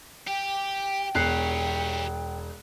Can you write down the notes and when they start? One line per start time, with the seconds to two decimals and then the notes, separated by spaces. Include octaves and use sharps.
0.27 G4 G5
1.15 E1 G4 C#5 F#6 C7